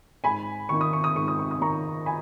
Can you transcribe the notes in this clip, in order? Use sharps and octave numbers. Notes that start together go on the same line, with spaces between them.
G#2 G#5 B5
D#3 A#3 D#4 C#6
D#6
C#6
D#6
G#2 C#6
D#6
C#6
D#6
D#3 A#3 D#4 A#5 C#6
G#5 B5